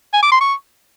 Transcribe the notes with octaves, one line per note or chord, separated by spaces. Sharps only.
G#5
D6
C6
C#6